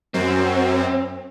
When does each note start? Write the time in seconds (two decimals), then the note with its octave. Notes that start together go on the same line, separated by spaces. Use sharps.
0.14 F#2 C4